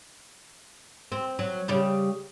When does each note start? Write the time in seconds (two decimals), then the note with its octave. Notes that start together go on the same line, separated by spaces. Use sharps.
1.12 C4
1.39 F#3
1.68 C#3 G3 G4